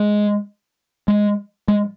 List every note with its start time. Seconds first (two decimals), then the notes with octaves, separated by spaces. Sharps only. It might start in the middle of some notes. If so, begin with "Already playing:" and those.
Already playing: G#3
1.08 G#3
1.68 G#3